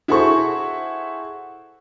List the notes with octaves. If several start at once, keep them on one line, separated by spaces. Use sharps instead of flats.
E4 F#4 G#4 A4 C5 C#6